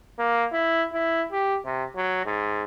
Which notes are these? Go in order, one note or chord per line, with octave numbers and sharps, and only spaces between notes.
A#3
E4
E4
G4
C3
F#3
G#2